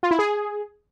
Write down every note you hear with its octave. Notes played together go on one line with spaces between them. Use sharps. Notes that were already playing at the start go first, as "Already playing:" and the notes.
F4
E4
G#4